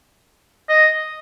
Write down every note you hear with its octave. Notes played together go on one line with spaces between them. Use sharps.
D#5